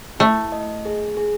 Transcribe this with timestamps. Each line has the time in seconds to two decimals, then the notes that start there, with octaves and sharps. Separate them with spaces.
0.19 A3 E4
0.52 D#5
0.85 G#4
1.17 G#4